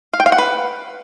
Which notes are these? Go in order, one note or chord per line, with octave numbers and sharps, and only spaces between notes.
F5
G5
F5
F#5
B4